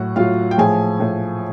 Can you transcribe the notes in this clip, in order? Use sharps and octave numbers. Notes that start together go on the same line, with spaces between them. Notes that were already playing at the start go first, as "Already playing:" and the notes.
Already playing: A2 F#3 F#4 F#5
A2 F#3 F4 F5
G5
A2 F3 G#4 G#5
A2 F3